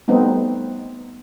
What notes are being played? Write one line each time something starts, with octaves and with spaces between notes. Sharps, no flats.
G3 A3 B3 C4 D#4